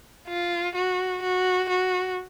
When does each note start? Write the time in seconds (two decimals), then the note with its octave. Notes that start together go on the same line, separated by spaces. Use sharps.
0.28 F4
0.75 F#4
1.22 F#4
1.69 F#4